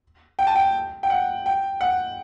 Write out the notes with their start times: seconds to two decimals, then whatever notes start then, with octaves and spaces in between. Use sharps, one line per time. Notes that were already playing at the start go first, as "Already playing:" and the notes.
0.39 G5
0.47 A5
0.55 G5
1.03 G5
1.10 F#5
1.46 G5
1.81 F#5